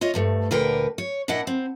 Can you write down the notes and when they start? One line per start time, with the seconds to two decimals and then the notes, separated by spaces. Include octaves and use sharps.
0.01 F4 C#5 D#5
0.14 D2 G2 A3
0.51 D2 A#2 D3 A#4 B4 G5
0.98 C#5
1.28 A#2 D4 E4 D#5 F#5
1.47 C4